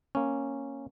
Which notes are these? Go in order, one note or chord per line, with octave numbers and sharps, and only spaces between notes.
A#3 C#4